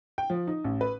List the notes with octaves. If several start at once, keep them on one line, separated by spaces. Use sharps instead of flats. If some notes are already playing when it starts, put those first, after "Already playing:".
G5
F3
D#4
A1
B4